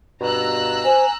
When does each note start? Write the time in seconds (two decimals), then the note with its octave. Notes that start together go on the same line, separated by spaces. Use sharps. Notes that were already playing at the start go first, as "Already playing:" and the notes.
0.21 G2 B2 A#5 E6 F#6
0.85 C5 G#5